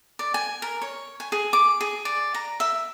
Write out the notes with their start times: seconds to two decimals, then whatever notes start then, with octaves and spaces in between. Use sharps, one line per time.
0.19 D5
0.34 G#5
0.62 A#4
0.82 C#5
1.20 G#5
1.32 G#4
1.53 D6
1.81 G#4
2.05 D5
2.34 A#5
2.60 E5